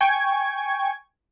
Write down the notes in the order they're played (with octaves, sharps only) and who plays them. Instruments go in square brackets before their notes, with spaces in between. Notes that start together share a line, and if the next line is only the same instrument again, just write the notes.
[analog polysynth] G5 G#5 C#6 G#6